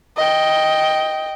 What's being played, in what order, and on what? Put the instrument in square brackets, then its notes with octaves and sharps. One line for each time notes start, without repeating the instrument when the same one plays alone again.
[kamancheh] D#5 G5